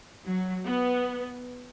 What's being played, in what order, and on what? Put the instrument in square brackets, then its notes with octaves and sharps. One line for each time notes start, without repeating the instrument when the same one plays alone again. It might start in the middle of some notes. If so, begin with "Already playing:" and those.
[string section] F#3
B3